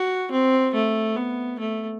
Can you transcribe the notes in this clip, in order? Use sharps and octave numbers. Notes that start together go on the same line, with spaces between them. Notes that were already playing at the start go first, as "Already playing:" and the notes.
Already playing: F#4
C4
A3
B3
A3